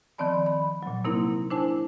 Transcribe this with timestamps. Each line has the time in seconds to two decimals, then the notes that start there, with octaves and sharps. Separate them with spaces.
0.18 D#3 F3 C4 D5 A5 B5
0.46 B5
0.83 A#2 F#3
1.04 C3 A#3 C4 D#4 E4 A#4
1.51 D4 E4 C5 G#5 A5